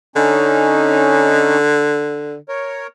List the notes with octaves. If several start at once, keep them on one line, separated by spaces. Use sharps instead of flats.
D3 C#4 D#4
A#4 C#5